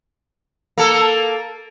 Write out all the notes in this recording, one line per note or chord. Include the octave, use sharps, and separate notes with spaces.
A#3 A4